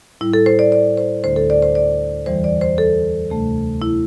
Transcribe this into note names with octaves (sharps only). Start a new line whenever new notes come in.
A2 G3 E4
A4
C5
D5
D5
C5
D2 D3 A3 C5
A4
D5
C5
D5
E2 E3 G3 C5
D5
C5
A4
D2 C3 A3
E4